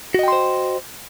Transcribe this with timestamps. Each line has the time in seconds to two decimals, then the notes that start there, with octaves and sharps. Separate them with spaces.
0.14 F#4
0.19 D#5
0.23 G5
0.28 C6
0.32 C5